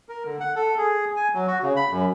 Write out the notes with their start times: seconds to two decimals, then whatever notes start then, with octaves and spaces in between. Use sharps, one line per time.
0.09 A#4
0.25 D3
0.40 F#5
0.56 A4
0.78 G#4
1.16 G#5
1.34 F#3
1.47 F#4
1.63 C#3
1.76 B5
1.91 F#2